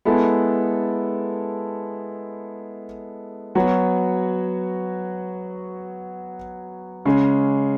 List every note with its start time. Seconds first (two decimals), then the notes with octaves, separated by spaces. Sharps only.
0.05 G#3 B3 E4 A4
3.55 F#3 B3 F#4 C#5
7.05 C#3 G#3 C#4